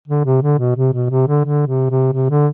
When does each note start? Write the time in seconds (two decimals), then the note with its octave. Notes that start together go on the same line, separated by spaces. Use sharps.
0.08 D3
0.25 C3
0.42 D3
0.58 B2
0.75 C3
0.93 B2
1.10 C3
1.27 D3
1.45 D3
1.67 C3
1.90 C3
2.12 C3
2.30 D3